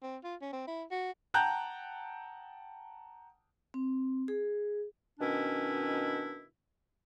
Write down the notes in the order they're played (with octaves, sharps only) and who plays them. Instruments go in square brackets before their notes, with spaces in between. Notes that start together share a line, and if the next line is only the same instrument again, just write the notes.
[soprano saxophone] C4
F4
C#4
C4
E4
F#4
[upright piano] F#5 G5 A5 A#5 F#6 G6
[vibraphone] C4
G#4
[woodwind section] B2 D#3 C#4 D4 E4